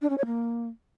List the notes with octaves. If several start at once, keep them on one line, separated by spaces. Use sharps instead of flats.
D4
C#4
C#5
A#3